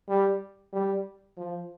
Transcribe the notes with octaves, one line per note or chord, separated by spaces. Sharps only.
G3
G3
F3